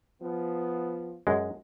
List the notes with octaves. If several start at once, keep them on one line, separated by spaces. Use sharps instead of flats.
F3 B3
F#2 G#3